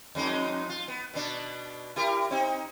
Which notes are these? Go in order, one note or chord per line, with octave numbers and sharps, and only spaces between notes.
F2 G#3 D#4
F4
B3
B2 B3 D4
E4 G4 A#4
C4 D#4